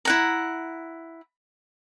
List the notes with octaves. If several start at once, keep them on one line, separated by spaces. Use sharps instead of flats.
E4 F#5 A#5